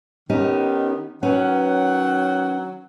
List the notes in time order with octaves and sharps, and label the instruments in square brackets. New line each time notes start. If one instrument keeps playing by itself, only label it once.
[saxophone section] D#3 B3 [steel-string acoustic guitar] C#4 D#4 G4
[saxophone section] D#3 F#3 F#5 [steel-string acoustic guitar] C#4 B4